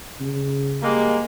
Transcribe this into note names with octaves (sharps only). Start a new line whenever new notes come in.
C#3
G3 G#3 A#3